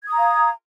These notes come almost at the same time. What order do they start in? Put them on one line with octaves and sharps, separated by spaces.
G#6 D#6 A#5 F5